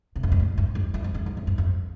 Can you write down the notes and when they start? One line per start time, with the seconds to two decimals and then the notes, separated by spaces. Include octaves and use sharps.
0.16 C3
0.23 F2
0.32 G2
0.40 A2
0.58 G2
0.75 F2
0.94 F2
1.04 G2
1.14 F2
1.26 G2
1.37 F2
1.47 G2
1.58 F2